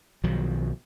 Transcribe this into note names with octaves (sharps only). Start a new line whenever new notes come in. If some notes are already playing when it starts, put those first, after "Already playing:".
B1 D#3 F3 F#3